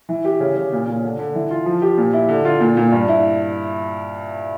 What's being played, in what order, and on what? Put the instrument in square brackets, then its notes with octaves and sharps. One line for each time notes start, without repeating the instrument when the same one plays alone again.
[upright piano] E3
G4
C#3
C#3
A#2
A#2
D3
D3
E3
F4
F3
G4
A#2
E4
D3
F4
A#2
A#2
G2
E4